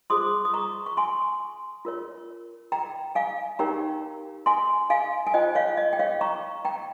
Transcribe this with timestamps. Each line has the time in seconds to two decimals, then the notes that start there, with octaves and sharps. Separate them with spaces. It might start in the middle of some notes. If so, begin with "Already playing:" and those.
0.10 F4 G#4 C5 C6 D#6
0.45 D#6
0.54 A#5 C#6
0.86 C#6
0.97 G#5 C6
1.85 F4 A#4 C#5
2.72 G5 A#5
3.15 F5 G#5
3.59 D#4 G4 A#4 C#5 G5 A#5
4.46 G#5 C6
4.90 F5 G#5
5.27 G#5
5.34 F4 C5 D#5 G5
5.55 C#5 F5
5.77 D#5
5.93 G5
5.99 C#5 F5
6.21 A#5 C#6
6.65 G5 A#5